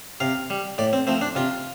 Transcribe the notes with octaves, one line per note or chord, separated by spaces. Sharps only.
C3 F5
G3
A2 D5
C4
F3 A3 C4
D4
C3 F4